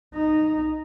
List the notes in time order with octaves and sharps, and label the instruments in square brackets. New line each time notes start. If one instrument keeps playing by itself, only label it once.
[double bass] D#4